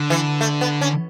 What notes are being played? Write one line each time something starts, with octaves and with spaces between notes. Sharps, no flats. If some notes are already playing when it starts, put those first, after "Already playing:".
Already playing: D3
E3
A3
B3
C#4